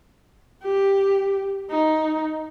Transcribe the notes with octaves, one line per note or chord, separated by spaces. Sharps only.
G4
D#4